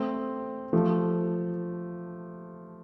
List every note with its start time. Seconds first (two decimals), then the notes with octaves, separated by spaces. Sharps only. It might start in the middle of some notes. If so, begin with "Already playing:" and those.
Already playing: A3 C4
0.73 F3 A3